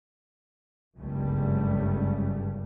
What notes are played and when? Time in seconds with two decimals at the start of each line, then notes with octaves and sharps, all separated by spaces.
0.96 G1 C#2 F#2 C#3 G3 A3